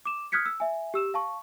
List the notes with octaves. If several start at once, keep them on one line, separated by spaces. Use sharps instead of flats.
D6 E7
D#6 F6 F#6 G#6 B6 C#7
E6
E5 G#5
G4 E6 E7
F5 A5 C#6